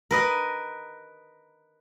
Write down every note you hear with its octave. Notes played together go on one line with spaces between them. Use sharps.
A#4 B4 D#5